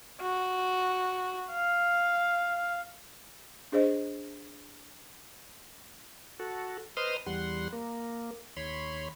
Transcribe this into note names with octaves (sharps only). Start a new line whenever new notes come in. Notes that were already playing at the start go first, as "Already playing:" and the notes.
F#4
F5
D4 G#4 C5 D#5
F#4 A4
B4 C5 D#5 C6 D#6 F6
E2 G3 F#5 C6
A#3
D#2 C#5 B5 C6